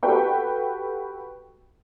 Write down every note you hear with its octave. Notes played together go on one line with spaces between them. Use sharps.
F#4 G4 A4 B4 G5 C#6